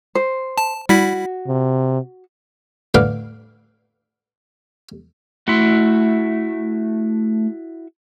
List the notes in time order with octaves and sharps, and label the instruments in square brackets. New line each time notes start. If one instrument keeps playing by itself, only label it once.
[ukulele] C5
[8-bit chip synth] A5
[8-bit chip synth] G3 E4 B6 [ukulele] F#4
[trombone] C3
[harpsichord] A2 D3 B4 F5 D6
[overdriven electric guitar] A3 C6 [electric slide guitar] E4 F#4